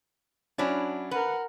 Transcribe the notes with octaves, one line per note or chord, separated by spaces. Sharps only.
F#3 C#4 D4 E4 D5
A#4 B4 F#5